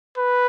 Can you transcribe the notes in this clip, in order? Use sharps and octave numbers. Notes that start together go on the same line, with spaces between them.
B4